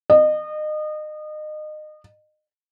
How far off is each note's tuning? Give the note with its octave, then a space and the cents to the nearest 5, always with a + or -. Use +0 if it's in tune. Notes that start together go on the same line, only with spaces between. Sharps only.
D#5 -30